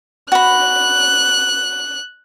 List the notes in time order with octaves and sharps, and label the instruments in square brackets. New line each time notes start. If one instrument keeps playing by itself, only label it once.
[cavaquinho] F#4 B5 [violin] F#6